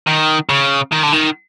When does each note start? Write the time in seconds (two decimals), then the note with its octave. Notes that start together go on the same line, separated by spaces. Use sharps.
0.07 D#3
0.50 C#3
0.92 D#3
1.03 D3
1.13 D#3